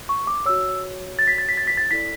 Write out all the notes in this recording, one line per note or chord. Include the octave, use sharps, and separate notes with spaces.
C#6
D6
F#4 C#5 E6
A6
B6
A6
B6
A6
B6
A6
E4 A4 D5 B6